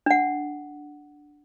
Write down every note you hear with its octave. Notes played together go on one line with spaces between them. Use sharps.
D4 F#5